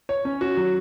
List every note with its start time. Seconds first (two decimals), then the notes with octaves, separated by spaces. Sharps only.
0.09 C#5
0.25 C#4
0.41 F#4
0.57 F#3